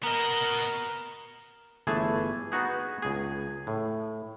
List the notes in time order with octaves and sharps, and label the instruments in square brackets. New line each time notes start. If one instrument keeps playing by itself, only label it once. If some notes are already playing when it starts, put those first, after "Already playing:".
[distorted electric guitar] B3 D#5 [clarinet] A#4 [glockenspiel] A#5 E7
[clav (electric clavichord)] G1 E3 A3 G#4 A5
B3 D#4 F#4 G#4
C#2 G#4
A2